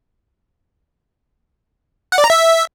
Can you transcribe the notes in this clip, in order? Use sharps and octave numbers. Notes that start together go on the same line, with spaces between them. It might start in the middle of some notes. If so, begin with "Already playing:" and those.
F#5
D5
A#5
E5